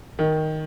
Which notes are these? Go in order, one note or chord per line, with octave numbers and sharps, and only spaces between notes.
D#3